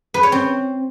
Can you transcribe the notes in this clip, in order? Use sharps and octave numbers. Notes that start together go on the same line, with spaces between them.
B4
C#5
C4